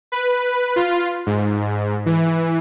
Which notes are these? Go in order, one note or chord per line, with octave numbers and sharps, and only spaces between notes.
B4
F4
G#2
E3